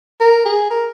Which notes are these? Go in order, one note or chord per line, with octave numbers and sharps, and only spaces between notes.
A#4
G#4
A#4